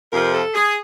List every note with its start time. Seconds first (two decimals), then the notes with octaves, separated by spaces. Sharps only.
0.10 F2 C3 F3 A#4
0.32 A4
0.54 G#4